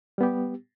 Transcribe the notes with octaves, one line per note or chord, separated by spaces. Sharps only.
G3 B3 G4